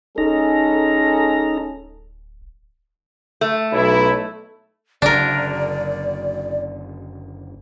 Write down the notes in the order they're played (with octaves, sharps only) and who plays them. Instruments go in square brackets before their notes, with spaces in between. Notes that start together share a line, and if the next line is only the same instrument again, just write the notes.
[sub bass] D1 [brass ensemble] G#3 C#4 A4 [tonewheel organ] D#4 A#5
[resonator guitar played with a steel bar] A3
[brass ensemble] B1 E4
[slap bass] F#1 F#2 D3 [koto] D4 A#4 [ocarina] D5